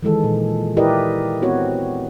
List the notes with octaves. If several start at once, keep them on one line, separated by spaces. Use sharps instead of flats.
D#3 E3 G#3 A4
A#2
E4 G4 A#4 B4 D5 D#5
B3 C4 F#4 C#5